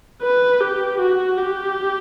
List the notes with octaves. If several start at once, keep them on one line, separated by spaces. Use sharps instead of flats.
B4
G4
F#4
G4